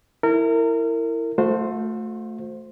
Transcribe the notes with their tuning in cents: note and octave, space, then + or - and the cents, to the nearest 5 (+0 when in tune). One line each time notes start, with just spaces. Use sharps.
E4 +0 A#4 -30
A3 +0 F#4 -45 C5 +0